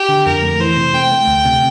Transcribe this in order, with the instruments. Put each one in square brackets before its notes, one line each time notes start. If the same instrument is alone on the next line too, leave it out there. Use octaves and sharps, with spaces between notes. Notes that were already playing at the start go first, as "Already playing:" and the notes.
Already playing: [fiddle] G4
[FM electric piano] D3
[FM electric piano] F2 [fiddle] A#4
[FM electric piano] A3
[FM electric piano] E3 [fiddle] C5
[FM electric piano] C3
[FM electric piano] A3 [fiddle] G5
[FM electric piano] A3
D2
C3